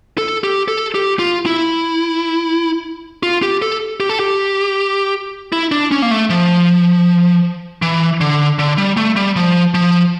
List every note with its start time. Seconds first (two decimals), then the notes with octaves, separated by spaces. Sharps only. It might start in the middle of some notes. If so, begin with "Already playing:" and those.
0.18 A4
0.44 G4
0.68 A4
0.95 G4
1.19 F4
1.46 E4
3.23 F4
3.43 G4
3.62 A4
4.00 G4
4.10 A4
4.20 G4
5.52 E4
5.72 D4
5.91 C#4
6.02 A#3
6.11 A3
6.30 F3
7.82 E3
8.21 D3
8.59 D3
8.78 G3
8.97 A3
9.16 G3
9.36 F3
9.74 F3